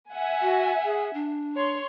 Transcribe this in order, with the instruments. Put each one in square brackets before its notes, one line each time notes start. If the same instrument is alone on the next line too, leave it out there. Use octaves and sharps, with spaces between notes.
[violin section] E5 F#5 G#5
[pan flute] F#4
G#4
D4
[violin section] C#5 C6